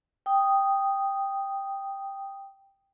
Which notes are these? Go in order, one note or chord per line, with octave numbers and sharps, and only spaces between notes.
G5 D#6